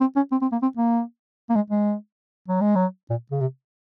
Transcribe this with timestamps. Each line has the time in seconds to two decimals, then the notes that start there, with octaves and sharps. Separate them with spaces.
0.01 C4
0.16 C#4
0.32 C4
0.42 C4
0.52 A#3
0.62 C4
0.77 A#3
1.50 A#3
1.55 G#3
1.70 G#3
2.48 F#3
2.61 G#3
2.76 F#3
3.10 A#2
3.31 C#3
3.41 C3